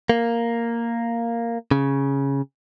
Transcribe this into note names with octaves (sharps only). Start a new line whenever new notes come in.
A#3
C#3